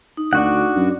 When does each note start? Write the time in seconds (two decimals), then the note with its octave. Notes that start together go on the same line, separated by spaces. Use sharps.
0.17 D#4
0.33 D2 D4 F#4 F#5
0.76 F#2